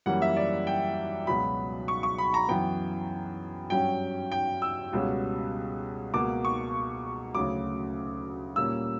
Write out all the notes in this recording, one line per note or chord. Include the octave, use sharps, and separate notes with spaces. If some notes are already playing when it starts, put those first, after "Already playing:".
F#2 E3 G3 A#3 C#4 F#5
E5
D5
G5
C#2 B2 F#3 B5
C#6
C#6
B5
A#5
F#2 E3 B3 G5
G2 F#3 C#4 G5
G5
E6
C#2 B2 G3 C#4
C#2 B2 A#3 D6
C#6
D2 C#3 F#3 D6
A#2 G3 A#3 C#4 E6